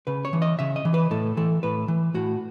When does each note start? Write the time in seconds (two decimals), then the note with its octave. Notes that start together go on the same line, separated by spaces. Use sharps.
0.07 C#3 B4
0.25 C#5
0.33 E3
0.42 D#5
0.59 C#3 E5
0.76 D#5
0.85 E3
0.94 B4
1.11 A2 A4
1.37 E3 A4
1.63 A2 B4
1.88 E3
2.14 A2 F#4